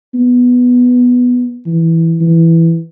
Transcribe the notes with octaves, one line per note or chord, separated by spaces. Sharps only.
B3
E3
E3